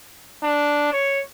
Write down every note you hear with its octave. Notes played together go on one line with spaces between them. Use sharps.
D4
C#5